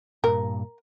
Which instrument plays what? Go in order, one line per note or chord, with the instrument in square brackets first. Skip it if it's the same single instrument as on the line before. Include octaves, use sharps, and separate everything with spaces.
[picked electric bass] G2 A#2 [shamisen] A#4